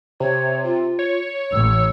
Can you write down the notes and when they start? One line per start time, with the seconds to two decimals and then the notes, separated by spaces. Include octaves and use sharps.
0.20 C3 C#5
0.63 F4
0.99 C#5
1.52 A1 E6